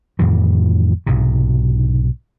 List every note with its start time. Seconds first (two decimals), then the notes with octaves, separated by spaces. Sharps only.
0.19 F2 A2 D#3 E3
1.06 B1 G#2 C3